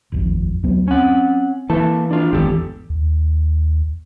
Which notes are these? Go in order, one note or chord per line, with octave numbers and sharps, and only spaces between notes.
D#1 G#1 F2
D2 F#3 B3
C4 C#4 F#5
E3 A#3 A4 A5
D4 F4
G#1 E2 G4 A4
D#2